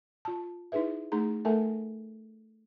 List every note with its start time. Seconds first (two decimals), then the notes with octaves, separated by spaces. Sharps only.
0.25 F4 A5
0.72 D#4 E4 G#4 B4 E5
1.12 A3 D#4 G#4 A#5
1.45 A3 A4 A#4 E5 G#5 A5